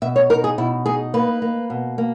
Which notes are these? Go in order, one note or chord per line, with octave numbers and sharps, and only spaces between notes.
B2 E5
C#5
D#4 A#4
G#4
B2 E4
D#4 G#4
A#3 B4
A#3
B2
A#3